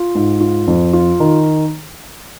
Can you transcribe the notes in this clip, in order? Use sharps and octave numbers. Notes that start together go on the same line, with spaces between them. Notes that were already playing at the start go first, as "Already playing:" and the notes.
Already playing: F4
G#2
F4
F2
F4
D#3